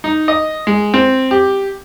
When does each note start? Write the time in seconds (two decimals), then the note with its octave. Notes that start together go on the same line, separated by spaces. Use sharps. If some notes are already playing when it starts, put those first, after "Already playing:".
0.04 D#4
0.28 D#5
0.67 G#3
0.94 C4
1.31 G4